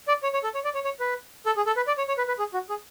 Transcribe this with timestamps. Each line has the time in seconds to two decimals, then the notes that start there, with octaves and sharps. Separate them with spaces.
0.08 D5
0.23 C#5
0.34 C#5
0.44 A4
0.54 C#5
0.64 D5
0.74 C#5
0.85 C#5
1.00 B4
1.46 A4
1.57 G#4
1.66 A4
1.77 B4
1.87 D5
1.98 C#5
2.08 C#5
2.18 B4
2.28 B4
2.39 G#4
2.54 F#4
2.70 G#4